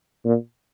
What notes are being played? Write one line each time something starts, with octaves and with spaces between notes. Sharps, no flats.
A#2